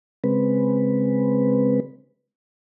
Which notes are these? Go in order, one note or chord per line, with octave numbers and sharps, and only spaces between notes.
C#3 G#3 C4 B4